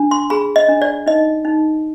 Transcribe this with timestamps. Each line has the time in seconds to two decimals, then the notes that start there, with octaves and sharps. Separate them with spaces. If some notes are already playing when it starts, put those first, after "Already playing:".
Already playing: D4
0.11 C6
0.30 G#4 B5
0.56 D#5
0.68 D4
0.82 D5
1.06 D#4 D#5
1.45 D#4